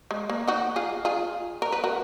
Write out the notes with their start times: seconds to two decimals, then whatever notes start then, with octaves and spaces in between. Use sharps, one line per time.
0.11 G#3
0.30 A#3
0.48 D#4 F#4
0.76 F4 G#4
1.05 F4 G#4
1.62 A#4
1.72 B4
1.84 F#4 A#4